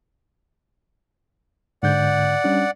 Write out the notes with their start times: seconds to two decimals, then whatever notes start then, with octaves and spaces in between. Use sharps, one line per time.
1.83 G#2 D3 D5 F#5 G6
2.44 G3 C#4 D4